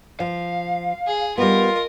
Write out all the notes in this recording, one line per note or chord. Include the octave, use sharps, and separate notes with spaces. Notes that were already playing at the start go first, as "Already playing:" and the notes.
F3 F5
G#4
G3 B3 F4 A#4 D#5